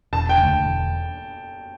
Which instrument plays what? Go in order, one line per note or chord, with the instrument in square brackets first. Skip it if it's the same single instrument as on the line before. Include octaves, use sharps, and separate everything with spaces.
[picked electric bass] E1 [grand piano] A5
[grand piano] G5
[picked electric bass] D3
D2
E1